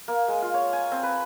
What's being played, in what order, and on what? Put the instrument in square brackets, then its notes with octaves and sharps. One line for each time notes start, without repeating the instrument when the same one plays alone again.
[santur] A#3
G#3
F4
C#5
G#5
C4
B4